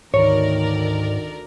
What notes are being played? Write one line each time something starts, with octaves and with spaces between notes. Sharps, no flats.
D2 G#2 D#3 A#4 C#5 D5